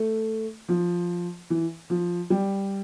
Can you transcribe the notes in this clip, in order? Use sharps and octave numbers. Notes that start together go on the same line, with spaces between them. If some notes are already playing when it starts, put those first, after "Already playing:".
Already playing: A3
F3
E3
F3
G3